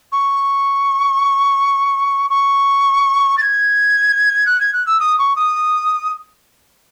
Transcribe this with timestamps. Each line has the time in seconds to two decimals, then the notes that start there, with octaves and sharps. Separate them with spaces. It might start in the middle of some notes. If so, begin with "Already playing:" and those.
0.12 C#6
2.30 C#6
3.37 A6
3.41 G#6
4.46 F#6
4.60 G#6
4.73 F#6
4.86 E6
4.99 D#6
5.18 C#6
5.36 D#6